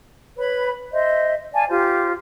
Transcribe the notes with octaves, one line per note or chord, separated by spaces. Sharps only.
B4 C#5 B5
C5 D#5 E5
D5 F5 G#5 A5
F4 G4 C5